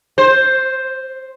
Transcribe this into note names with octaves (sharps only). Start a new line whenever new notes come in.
C5